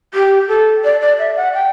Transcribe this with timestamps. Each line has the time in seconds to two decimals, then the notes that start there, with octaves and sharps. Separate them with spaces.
0.14 G4
0.48 A4
0.84 D5
1.01 D5
1.19 E5
1.37 F#5
1.54 G5